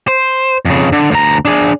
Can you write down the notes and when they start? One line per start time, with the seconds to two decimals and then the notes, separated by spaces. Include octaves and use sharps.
0.08 C5
0.65 F2 C#3
0.92 D3
1.11 D2 A#5
1.45 D4 G#4